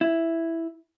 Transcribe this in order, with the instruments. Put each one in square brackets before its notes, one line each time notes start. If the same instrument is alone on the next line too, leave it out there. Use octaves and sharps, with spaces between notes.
[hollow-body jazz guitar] E4